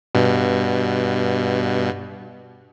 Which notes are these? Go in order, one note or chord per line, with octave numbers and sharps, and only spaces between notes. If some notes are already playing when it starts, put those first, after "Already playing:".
G2 B2